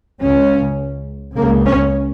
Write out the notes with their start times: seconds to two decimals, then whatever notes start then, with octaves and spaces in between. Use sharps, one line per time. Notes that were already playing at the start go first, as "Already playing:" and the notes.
0.21 C#2 C#3 C#4
1.37 C#2 C#3 A#3
1.66 C#4